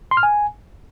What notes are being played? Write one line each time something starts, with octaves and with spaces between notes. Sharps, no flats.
C6
F6
G#5